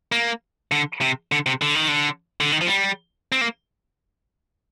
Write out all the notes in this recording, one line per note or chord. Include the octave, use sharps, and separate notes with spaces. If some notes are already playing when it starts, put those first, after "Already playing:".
A#3
D3
C3
D3
C3
D3
D#3
D3
D3
D#3
F3
G3
C4
A#3